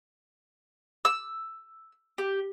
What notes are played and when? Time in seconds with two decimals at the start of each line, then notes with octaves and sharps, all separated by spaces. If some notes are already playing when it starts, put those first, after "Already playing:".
1.05 E6
2.18 G4